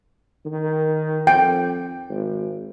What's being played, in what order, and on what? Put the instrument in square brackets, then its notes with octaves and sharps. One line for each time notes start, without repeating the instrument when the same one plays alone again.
[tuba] D#3
[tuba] F2 [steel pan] G5
[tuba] G#1